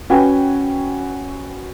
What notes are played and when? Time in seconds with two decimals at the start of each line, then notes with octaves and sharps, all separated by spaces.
0.10 C#4 F#4 B4 G5 G#5